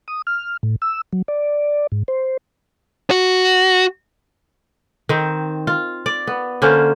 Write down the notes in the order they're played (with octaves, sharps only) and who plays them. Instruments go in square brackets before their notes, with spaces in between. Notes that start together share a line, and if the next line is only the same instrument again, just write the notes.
[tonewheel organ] D#6
F6
A2
E6
F#3
D5
G#2
C5
[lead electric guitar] F#4
[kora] D#3 C4
F4
D5
B3
D3 A#3 C#4 C5